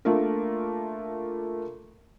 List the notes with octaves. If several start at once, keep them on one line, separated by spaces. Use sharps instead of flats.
A3 A#3 D4 F4 A#4